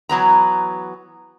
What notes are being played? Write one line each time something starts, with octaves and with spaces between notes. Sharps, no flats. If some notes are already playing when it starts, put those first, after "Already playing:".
E3 F#3 B3 A#5